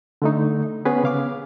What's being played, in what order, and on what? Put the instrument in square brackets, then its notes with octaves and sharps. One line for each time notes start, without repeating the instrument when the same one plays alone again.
[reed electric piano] D3 A3 D#4
B3 C#4 G#4 B4
C#3 F5 D6